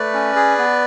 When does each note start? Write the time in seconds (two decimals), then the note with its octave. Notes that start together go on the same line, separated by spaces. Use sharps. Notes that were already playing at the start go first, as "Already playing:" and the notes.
Already playing: A3 B4 D5
0.14 C#4
0.36 G#4
0.58 B3